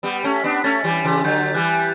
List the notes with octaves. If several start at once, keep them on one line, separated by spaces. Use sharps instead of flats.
G3 B3
A3 C#4
B6
B3 D4
A3 C#4 A6
E3 G3
C#3 E3
D3 F#3 G6
E3 G3 F#6